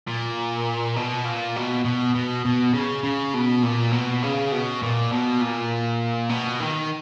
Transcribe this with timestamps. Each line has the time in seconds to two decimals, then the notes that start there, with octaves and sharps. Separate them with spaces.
0.08 A#2
0.96 B2
1.25 A#2
1.56 B2
1.84 B2
2.15 B2
2.45 B2
2.74 C#3
3.03 C#3
3.34 B2
3.63 A#2
3.92 B2
4.23 C#3
4.52 B2
4.82 A#2
5.12 B2
5.41 A#2
6.29 B2
6.60 D#3